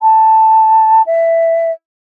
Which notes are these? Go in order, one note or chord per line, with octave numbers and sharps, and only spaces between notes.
A5
E5